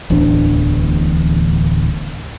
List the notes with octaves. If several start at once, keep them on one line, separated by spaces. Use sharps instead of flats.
D1 A1 E2 D4